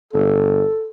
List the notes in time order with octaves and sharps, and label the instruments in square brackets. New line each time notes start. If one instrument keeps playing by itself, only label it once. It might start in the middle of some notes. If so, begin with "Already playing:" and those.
[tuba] G1 [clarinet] A4